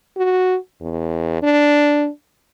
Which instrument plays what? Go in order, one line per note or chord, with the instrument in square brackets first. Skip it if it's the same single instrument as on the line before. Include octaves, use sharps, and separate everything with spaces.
[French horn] F#4
E2
D4